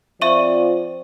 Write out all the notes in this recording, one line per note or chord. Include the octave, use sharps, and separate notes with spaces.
F3 C4 F4 D5 E5 C#6 D#7